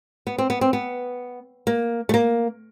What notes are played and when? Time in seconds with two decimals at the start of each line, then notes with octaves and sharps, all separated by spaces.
0.27 B3
0.38 C4
0.50 B3
0.61 C4
0.73 B3
1.67 A#3
2.09 A3
2.14 A#3